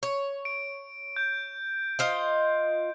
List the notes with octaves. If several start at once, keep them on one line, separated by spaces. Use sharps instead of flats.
C#5
D7
G6
F4 C5 D#5